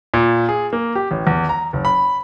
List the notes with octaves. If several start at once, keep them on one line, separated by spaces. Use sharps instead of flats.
A#2
G#4
A#3
G4
A1
E2
A#5
F#1
B5